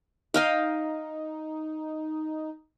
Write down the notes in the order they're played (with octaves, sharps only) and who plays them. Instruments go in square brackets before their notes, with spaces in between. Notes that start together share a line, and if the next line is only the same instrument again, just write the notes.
[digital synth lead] D#4 [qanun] D#5 F5 G5